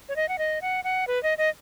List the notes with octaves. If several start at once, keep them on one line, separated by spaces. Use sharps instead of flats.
C#5
D#5
F#5
D#5
F#5
F#5
B4
D#5
D#5